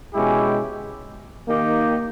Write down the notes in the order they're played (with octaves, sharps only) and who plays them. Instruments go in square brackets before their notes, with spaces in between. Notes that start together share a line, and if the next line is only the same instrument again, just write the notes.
[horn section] B2 G#3 C#4 E4 G4
D#3 A#3 D#4 G4